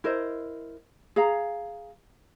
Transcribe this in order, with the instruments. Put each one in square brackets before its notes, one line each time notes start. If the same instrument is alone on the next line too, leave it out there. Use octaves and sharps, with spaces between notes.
[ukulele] E4 A#4 C5 D#5
G#4 F5 A#5